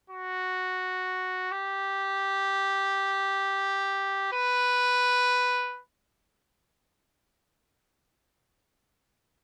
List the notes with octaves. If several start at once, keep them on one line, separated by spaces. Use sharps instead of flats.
F#4
G4
B4